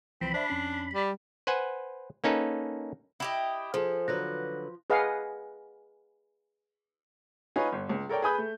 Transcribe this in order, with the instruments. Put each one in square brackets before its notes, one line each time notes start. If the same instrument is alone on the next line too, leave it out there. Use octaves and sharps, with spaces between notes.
[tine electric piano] C2 E3 F3 [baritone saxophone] C4 [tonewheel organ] B5
[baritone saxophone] D4 [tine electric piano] C5 D5 E5
[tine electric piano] F2 C#4 C7
[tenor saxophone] G3
[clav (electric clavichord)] B4 C5 F#5 G#5
A#3 C#4 D#4 A4 B4
[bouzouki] E4 G4 D#5
[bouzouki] F3 [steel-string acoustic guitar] G#4 A4 [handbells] C5
[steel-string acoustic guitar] D3 F#3 B4 [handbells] F#6 A#6
[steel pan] G#4 B4 D#5 F5 F#5
[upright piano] D#4 F4 B4 C#5 F5 G#5
G1
C#2
A4 A#4 C#5 D5 G5
G#4 B4 G#5 B5 D#6 G6
A3